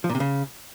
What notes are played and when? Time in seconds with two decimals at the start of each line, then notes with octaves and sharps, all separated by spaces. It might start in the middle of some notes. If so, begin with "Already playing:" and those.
0.04 F3
0.09 A#2
0.15 C3
0.20 C#3